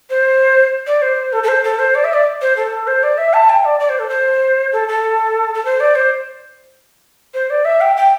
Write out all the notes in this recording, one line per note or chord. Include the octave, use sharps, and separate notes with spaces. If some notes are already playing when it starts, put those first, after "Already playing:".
C5
D5
C5
A4
A4
C5
A4
C5
D5
E5
D5
C5
A4
C5
D5
E5
A5
G5
D5
D5
C5
A4
C5
A4
A4
A4
C5
D5
C5
C5
D5
E5
G5
G5